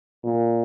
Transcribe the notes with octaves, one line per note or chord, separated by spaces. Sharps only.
A#2